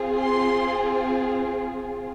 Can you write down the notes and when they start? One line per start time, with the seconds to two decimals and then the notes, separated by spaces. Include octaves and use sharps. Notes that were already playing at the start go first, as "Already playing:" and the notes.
Already playing: C4 F4 G#4
0.20 C6